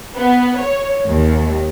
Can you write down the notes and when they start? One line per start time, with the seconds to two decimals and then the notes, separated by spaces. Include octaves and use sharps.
0.16 B3
0.57 C#5
1.07 D#2